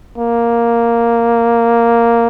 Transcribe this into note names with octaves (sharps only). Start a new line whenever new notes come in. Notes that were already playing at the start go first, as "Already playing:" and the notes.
A#3